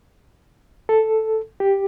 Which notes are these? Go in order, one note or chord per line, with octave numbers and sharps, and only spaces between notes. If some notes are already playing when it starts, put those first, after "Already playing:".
A4
G4